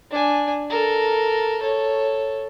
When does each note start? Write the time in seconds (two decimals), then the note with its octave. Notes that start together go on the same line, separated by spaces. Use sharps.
0.10 D4 G#5
0.70 A4 A#4
1.61 A4 C#5